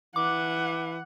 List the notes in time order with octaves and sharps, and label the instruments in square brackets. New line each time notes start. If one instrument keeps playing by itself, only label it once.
[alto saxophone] E3 [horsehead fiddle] F#5 [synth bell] D6